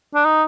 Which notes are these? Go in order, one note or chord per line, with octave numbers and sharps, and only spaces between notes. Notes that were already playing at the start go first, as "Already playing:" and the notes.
D4
D#4